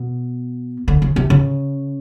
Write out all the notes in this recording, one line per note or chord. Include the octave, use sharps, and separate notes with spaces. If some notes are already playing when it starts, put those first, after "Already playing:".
Already playing: B2
D3
C#3
C3
C#3